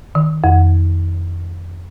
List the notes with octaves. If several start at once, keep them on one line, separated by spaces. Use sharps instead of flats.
D#3
F2